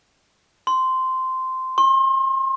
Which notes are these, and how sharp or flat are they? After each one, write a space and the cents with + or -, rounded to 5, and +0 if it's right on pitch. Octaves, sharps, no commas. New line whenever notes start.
C6 -10
C6 +40